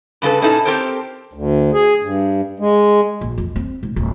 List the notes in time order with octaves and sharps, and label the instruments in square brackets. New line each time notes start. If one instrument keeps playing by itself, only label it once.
[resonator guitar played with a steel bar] G2 C#3 C4 A4 B4
A#2 C#4 D#4 E4 A4
C4 G4 A4 A#4 C5
[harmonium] D2
G#4
G2
G#3
[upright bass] A#1
F2
C4
G#2
D1